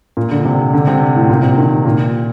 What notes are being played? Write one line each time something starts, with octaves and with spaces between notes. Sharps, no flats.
A#2
D3
C3
D3
C3
A2
A#2
C3
D#3
A#2